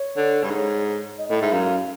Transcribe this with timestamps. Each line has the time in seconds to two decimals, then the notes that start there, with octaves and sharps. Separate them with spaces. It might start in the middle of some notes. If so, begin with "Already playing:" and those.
Already playing: C#5
0.16 D3
0.43 G2
0.50 G#2
1.18 D#5
1.29 A2 D#5
1.41 G#2 E5
1.52 F#2 F5